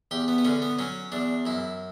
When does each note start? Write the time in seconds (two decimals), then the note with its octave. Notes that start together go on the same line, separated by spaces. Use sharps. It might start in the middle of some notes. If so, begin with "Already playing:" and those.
0.11 E2 G4
0.28 B3
0.38 B3
0.45 D3 C#4
0.62 B3
0.79 F#3 C#4
1.12 E2 D4
1.46 F#2 E4